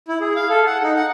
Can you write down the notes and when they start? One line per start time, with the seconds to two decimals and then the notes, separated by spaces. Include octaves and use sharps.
0.08 E4
0.21 G#4
0.36 F5
0.49 A4
0.66 F#5
0.83 D#4
0.96 F#5